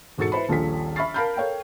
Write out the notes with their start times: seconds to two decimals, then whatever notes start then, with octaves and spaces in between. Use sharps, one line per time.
0.18 E1 G#2 F#4 A4 A6 C#7
0.32 E4 B4 C5 B5
0.49 D#1 A#1 F4 A4 G#5 B6
0.96 E5 B5 C#6 F6 A6 C7
1.14 A#4 F5 A5 B5 F6 G6
1.37 A4 A#4 C#5 F5 G5